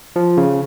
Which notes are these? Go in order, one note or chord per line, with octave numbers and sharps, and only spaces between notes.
F3
C#3